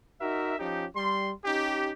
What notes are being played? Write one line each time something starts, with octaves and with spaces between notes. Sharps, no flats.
D#4 F#4 A#4 E5
F3 C#4 D#4 G4
G3 C6
C#4 D#4 G4